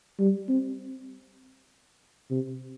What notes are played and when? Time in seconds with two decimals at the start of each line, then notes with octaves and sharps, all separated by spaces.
0.19 G3
0.49 C4
2.31 C3